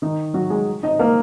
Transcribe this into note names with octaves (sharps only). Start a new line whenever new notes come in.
D#3 D#4
F#3 F#4
G#3 G#4
D#4 D#5
A#3 A#4